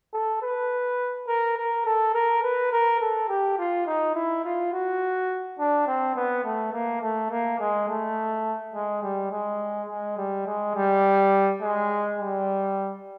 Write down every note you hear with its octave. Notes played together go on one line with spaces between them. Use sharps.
A4
B4
A#4
A#4
A4
A#4
B4
A#4
A4
G4
F4
D#4
E4
F4
F#4
D4
C4
B3
A3
A#3
A3
A#3
G#3
A3
G#3
G3
G#3
G#3
G3
G#3
G3
G#3
G3